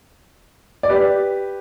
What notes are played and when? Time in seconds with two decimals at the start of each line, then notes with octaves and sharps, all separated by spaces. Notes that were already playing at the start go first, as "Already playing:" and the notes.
0.83 D5
0.89 G4 B4